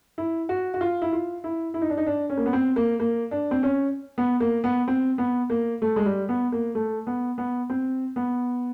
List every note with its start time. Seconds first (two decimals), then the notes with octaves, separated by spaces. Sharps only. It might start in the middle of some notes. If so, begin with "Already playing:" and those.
0.18 E4
0.49 F#4
0.74 F#4
0.81 F4
1.02 E4
1.13 F4
1.44 E4
1.74 E4
1.82 D#4
1.90 D4
1.97 D#4
2.06 D4
2.30 C#4
2.37 A#3
2.46 B3
2.53 C4
2.76 A#3
3.00 A#3
3.31 D4
3.51 C4
3.63 C#4
4.18 B3
4.40 A#3
4.64 B3
4.88 C4
5.18 B3
5.50 A#3
5.82 A3
5.96 G#3
6.05 G3
6.29 B3
6.52 A#3
6.75 A3
7.07 B3
7.38 B3
7.70 C4
8.16 B3